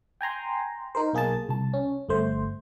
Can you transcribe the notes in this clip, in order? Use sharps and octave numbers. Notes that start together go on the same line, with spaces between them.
G5 G#5 A#5 C6
D#4 A#4 C5
B1 A#3 G#4 G#5 A5
C2 A5
C#4
G1 A3 C5